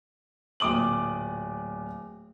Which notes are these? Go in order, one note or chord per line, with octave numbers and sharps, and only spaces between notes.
D1 A#2 D6 D#6 F#7